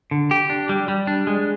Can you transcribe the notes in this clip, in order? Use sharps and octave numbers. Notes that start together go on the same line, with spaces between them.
D3
G4
D4
G3
G3
D4
G#3